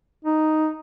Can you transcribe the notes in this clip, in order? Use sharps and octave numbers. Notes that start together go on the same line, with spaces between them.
D#4